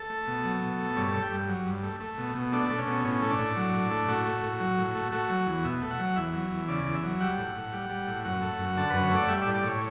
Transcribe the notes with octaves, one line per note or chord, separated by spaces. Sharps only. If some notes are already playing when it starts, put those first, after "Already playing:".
Already playing: A4
A3
B2
F#3
B2
A3
G2 C#5
A4
A3
G4
G2
F#3
G2
A3
A3
B2
B2
A3 D4
A3
C#4
B2
A2 C#4
A3
D4
A2
F#3
A2
A3
A2 F#4
A3
A2
F#3
A2
A3
A3 F#4
F#3
E2
B2 E5
A3
F#5
F#3
E2 E5
F#3
E2
C#3 D5
E2
E5
F#3
G3 F#5
A2
A2
G3
G3
A2
F#2 F#5
A3
F#2
D3 A4
F#2 B4
C#5
A3 D5
G3 E5
D5
A2
D5
A2 C#5